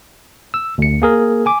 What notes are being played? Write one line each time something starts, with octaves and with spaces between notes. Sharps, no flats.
E6
D2 C#7
A#3 G#4 A#4
G#5 D6